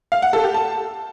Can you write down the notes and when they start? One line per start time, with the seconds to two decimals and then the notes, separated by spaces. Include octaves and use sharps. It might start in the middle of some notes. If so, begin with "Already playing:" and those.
0.12 F5
0.22 F#5
0.33 A4
0.44 G4
0.54 A5